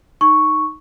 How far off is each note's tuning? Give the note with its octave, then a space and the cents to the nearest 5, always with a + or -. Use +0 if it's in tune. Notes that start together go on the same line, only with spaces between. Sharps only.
D#4 +0 C#6 +0